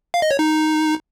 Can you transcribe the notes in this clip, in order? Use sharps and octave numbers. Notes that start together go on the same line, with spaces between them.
F5
D#5
C#5
D#4